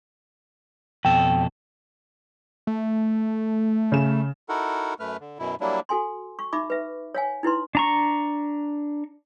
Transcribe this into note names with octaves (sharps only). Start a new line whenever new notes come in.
F2 B2 A4 G5
A3
C#3 E7
D#4 E4 F#4 A4 A#4 F#5
F#2 A3 B4 F6
D3
F#2 B2 E4
F#3 G3 A#3 D4 E4
F#4 A4 G#5 C6
C#6
D#4 E5 B5 D6
B4 E5
C#5 F5 G#5
D#4 E4 B4 C6
D4 A#5 C#6